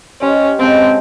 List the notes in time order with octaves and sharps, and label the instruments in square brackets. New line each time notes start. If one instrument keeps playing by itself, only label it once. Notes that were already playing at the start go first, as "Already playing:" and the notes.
[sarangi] C#4 [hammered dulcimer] G4 C5 D#5
[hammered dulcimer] C#3 G#3 A4 [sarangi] C4